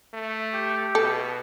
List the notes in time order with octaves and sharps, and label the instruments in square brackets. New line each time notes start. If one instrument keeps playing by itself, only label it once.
[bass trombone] A3
[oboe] G4
[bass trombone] B2 [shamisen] A4